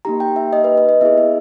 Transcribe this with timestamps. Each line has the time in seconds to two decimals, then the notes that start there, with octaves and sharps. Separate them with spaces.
0.05 A#3 D#4 G4 A#5
0.20 G5
0.36 E5
0.53 D#5
0.64 B4
0.77 B4
0.89 D#5
1.01 B3 E4 G#4 E5
1.18 E5